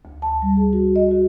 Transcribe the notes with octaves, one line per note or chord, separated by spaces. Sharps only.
D2
A5
G3
G#4
F#4
D#5
F#4